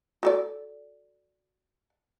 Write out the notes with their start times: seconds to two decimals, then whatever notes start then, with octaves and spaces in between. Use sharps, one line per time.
0.23 F#4 A4 D5